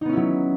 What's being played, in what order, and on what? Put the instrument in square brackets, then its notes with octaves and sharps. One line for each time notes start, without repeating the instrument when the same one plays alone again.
[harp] D#4
B3
C#4
E4
F#3